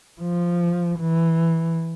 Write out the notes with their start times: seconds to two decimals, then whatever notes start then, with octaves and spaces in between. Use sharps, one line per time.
0.21 F3
0.99 E3